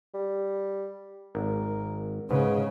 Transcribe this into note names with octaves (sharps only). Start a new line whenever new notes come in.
G3
G#1 A#4
G#2 C#3 B4